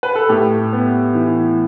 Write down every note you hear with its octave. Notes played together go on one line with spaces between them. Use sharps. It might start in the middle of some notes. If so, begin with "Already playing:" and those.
B4
A4
A2 G4
B3
E3